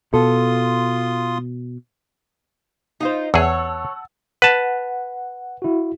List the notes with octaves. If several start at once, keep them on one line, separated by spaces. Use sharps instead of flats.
B2 F4 A4 C6 D#6
D#4 F4 C5
E2 G#4 C#5 F#5 A5 E6
B4 F#5 A5
E4 F#4